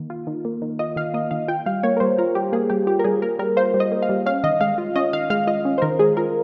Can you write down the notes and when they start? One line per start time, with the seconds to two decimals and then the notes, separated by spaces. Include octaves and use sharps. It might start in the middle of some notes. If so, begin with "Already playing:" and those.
Already playing: D#3 A#3
0.10 F4
0.27 D#3
0.45 A#3
0.62 D#3
0.79 F4 D#5
0.96 D#3 F5
1.14 A#3 D#5
1.31 D#3 F5
1.48 F4 G5
1.66 G3 F5
1.83 A#3 C#5
1.97 A#4
2.00 G3 C5
2.18 F4 A#4
2.35 G3 G4
2.53 A#3 G#4
2.70 G3 G4
2.87 F4 G4
2.99 A#4
3.04 G3 G#4
3.22 A#3 A#4
3.39 G3 A#4
3.57 F4 C5
3.74 G3
3.80 D#5
3.92 A#3
4.02 F5
4.09 G3
4.26 C#4 F5
4.44 D#3 D#5
4.61 G#3 F5
4.78 F4
4.96 C#4 D#5
5.13 D#3 F5
5.30 G#3 F5
5.47 F4 D#5
5.65 C#4
5.78 C5
5.82 D#3 A#4
5.99 G#3 G#4
6.17 F4 A#4